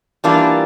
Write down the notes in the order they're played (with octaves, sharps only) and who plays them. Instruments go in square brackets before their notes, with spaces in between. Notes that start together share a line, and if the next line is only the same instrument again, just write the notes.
[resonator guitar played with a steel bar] E3 G3 A#3 D4 F4